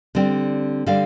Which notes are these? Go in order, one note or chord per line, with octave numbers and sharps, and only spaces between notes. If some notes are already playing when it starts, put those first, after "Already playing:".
D3 G3 C4
D3 G3 C4 D5 F5